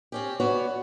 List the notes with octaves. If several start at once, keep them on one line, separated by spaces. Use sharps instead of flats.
C4 C#4 G4
B3 F#4 C#5 D5